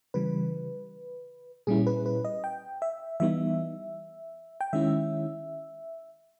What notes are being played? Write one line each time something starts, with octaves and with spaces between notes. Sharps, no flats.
C#3 E3 G3 B4
A#2 G3 C#4 E4 G#4
B4
B4
D#5
G5
E5
E3 G3 B3 D#4 E5
G5
D#3 G#3 C#4 E4 E5